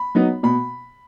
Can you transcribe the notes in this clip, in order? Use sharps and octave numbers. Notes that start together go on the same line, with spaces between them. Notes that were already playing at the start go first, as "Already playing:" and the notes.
Already playing: B5
F#3 B3 D#4
B2 B5